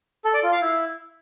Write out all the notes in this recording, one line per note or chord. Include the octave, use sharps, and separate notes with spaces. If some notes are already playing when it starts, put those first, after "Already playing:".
A4
D5
F4
F5
E4